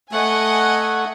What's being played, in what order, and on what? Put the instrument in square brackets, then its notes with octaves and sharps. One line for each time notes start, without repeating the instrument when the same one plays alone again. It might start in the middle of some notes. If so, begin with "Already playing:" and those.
[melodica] A3 [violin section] D#5 F#5 G#5